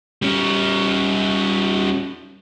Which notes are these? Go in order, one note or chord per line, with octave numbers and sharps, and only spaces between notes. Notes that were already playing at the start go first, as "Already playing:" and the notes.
G3 C#4